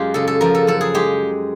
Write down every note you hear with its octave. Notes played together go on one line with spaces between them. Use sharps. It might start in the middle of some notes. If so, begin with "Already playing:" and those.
Already playing: F#2 G#3 F4 G4
C#3 A4
A4
F3 A#4
A4
F#2 A4
G#4
G#3 G4